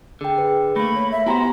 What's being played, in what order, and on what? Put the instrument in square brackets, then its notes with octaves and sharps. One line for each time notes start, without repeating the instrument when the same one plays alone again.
[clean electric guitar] D3 [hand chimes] G#4 G5
[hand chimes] G#4 B4
[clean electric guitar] A3 A#3 [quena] B5 [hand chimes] A#6
[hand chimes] C#5
[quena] E5
[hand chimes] B3 G4 G#5 [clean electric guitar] E4 F#4 C5 [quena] A#5